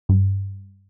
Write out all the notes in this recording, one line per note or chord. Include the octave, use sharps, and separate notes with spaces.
G2